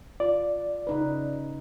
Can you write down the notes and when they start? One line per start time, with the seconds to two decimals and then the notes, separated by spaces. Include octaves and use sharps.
0.20 F4 D5
0.87 C#3 D#4 B4